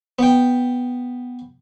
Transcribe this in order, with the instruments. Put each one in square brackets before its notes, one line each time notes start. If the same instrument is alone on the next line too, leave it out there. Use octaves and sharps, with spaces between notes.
[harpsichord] B3 G5